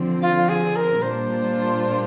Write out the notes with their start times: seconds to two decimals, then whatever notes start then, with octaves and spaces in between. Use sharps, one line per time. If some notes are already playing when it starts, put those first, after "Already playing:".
Already playing: D3 F3 C4
0.22 F4
0.49 G#4
0.76 A#4
1.02 A#2 G3 D4 F4 C5